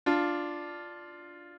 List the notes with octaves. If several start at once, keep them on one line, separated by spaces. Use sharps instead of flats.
D4 F4